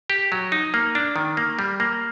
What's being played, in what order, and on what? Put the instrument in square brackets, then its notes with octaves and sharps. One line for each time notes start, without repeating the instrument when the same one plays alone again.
[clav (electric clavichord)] G4
F#3
D#4
A#3
D4
D#3
A#3
G3
A#3